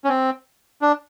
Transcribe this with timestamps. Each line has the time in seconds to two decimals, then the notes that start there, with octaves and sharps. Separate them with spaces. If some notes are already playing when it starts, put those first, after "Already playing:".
0.04 C#4
0.09 C4
0.82 D4